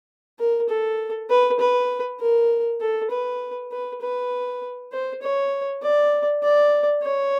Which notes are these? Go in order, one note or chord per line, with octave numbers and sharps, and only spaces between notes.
A#4
A4
B4
B4
A#4
A4
B4
B4
B4
C5
C#5
D5
D5
C#5